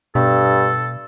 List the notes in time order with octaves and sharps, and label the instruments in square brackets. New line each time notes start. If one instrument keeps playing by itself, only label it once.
[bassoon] G2 [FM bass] B2 [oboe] A4